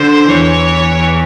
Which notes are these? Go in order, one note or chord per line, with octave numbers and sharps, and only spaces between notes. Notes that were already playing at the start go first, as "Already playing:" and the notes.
Already playing: D3 C5
E2 E3 C#5